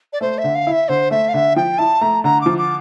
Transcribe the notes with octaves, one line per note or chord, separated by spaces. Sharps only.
D5
A3 C5
E5
D3
F5
E4
E5
D3 C5
A3 E5
F5
D3 E5
F3 G5
E4 A5
A3 A#5
D3 A#5
F3 D6
D6